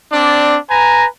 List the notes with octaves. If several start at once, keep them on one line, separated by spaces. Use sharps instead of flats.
C4 D4 D5
B4 G#5 A#5